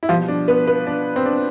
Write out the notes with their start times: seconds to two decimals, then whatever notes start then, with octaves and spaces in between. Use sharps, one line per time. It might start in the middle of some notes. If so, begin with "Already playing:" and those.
0.03 E4
0.09 B2 F3 G3 F4
0.28 D4
0.48 B3 B4
0.67 B3 B4
0.87 D4
1.16 C4
1.26 D4